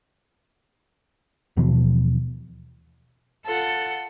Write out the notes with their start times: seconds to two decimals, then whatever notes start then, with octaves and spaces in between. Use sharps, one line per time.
1.57 D#2 B2 E3 F3
3.46 F4 A4 F#5